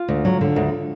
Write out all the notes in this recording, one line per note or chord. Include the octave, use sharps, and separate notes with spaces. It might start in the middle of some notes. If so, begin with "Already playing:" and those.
Already playing: F4
D2
F#3
D3
D2